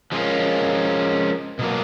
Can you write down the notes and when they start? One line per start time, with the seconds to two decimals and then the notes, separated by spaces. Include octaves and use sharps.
0.12 F3 G#3 C#4 F4 A#4
1.59 B2 F#3 A#3